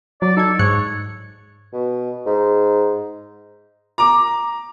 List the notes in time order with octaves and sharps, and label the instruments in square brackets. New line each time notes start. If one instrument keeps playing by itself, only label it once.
[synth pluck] F#3 [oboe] D5
[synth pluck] D#4 G#6 [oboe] A4
[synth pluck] G#2 F#6 C#7 [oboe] C#5
[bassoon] B2
G#2
[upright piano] A#5 D6